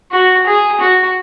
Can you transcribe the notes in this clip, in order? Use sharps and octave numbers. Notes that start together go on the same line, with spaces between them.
F#4
G#4
F#4